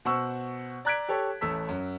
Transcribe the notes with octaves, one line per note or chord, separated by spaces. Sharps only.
B2 C5 F#5 C#6 E6
D5 A#5 F#6 G#6 B6 D7
G4 A4 C#5
A1 A3 E6 B6
F#2